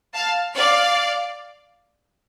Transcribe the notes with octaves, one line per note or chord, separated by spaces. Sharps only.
F5 A5
D5 F5